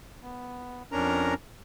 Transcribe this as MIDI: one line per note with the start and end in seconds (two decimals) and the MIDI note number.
0.22 0.83 59
0.92 1.34 41
0.92 1.34 61
0.92 1.34 62
0.92 1.34 70
0.92 1.34 82